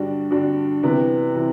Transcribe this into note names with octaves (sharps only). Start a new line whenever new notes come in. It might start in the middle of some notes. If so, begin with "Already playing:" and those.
Already playing: G2 D3 G3 D4 F#4
G2 D3 G3 D4 F#4
C3 E3 B3
C3 E3